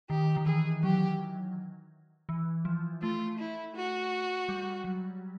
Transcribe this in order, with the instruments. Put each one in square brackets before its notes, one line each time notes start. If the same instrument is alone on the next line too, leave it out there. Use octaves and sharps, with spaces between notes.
[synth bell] D#3 [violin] G4
[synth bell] D#3
[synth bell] E3 [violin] G#4
[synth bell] F#3 [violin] G4
[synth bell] E3
F3
[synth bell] A3 [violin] F4
[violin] E4
F#4
[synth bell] G3
F#3